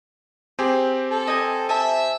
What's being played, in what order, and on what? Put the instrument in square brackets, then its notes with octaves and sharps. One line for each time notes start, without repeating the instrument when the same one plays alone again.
[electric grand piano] C4 G4 [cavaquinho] G#4
[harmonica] A4
[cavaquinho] D#5 G#5
[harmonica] E5 [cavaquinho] G#5 A5